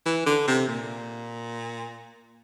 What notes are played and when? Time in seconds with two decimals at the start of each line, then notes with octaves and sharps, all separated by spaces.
0.06 E3
0.26 D3
0.47 C3
0.68 A#2